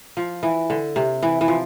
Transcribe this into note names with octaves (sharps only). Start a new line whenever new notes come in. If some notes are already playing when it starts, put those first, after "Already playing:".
F3
E3
D3
C3
E3
E3
F3